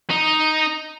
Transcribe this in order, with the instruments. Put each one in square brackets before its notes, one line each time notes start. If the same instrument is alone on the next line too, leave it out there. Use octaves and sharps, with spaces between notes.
[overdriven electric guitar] D#4